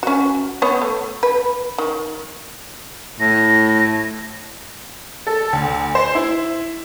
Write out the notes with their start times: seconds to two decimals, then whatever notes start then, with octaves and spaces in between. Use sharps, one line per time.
0.03 C#4 F#4
0.62 B3 C#5
0.82 A3
1.23 B4
1.78 D#3
3.20 A2 A#6
5.27 A4
5.53 D2
5.95 C5
6.15 E4